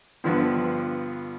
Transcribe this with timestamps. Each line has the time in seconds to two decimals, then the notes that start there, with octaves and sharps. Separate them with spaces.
0.24 G2 D3 F3 B3